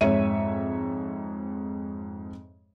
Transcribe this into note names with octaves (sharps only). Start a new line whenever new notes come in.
F2 G#2 C#5 E5 D#7